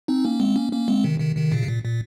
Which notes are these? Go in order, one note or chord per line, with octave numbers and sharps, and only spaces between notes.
C4 D#4
A#3 C#4
G#3 C4
A#3 C#4
A#3 C#4
G#3 C4
C3 D#3
C3 D#3
C3 D#3
A#2 C#3
C3
A#2
A#2